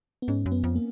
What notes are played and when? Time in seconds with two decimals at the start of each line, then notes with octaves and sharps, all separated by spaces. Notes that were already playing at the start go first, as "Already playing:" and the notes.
0.22 B3
0.28 G#2 C#4
0.46 F#2
0.52 B3
0.64 F2
0.75 A#3